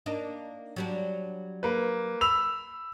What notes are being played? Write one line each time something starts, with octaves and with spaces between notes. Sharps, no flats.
A#3 D4 D#4
F#3 G3 D4
A#3 B4
B5 E6 F7